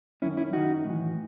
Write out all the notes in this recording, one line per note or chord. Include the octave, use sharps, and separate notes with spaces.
F#2 D#3 C#4 E4
C#4 E4
F#2 D#3 D#4 F#4
A2 E3